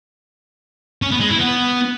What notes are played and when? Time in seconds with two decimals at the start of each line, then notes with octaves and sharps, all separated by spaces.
1.02 C#4
1.11 B3
1.20 G#3
1.29 E4
1.39 B3